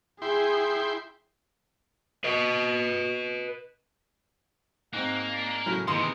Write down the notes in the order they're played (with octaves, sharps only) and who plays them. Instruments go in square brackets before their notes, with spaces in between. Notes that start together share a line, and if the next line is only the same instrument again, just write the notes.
[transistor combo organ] E4 G5 C6 [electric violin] G#4
[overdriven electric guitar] B4 D#5
[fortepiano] G#2 G#3 C4 [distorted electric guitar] A#3 [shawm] F#5
[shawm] D4
[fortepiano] A2 C#3 F#3 [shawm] A#4
[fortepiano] D#2 E3 G#3 [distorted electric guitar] C3 A#3 [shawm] D#5 [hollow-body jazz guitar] C6